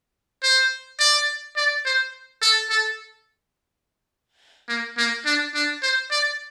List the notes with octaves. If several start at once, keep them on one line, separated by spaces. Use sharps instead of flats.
C5
D5
D5
C5
A4
A4
A#3
A#3
D4
D4
C5
D5